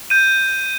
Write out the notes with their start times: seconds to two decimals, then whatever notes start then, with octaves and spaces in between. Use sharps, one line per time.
0.10 G6 D#7